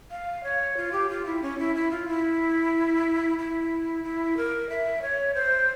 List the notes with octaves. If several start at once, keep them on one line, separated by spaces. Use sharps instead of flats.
F5
C#5
F4
G4
F4
E4
C#4
E4
E4
F4
E4
E4
E4
A#4
E5
C#5
C5